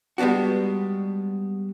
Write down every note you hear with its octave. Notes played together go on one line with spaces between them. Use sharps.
G3 G#3 B3 D4 F#4